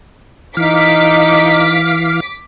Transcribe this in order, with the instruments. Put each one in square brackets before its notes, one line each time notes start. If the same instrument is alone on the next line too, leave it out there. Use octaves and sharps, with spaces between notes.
[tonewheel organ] E3 F5 [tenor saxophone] D#4 [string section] D6 B6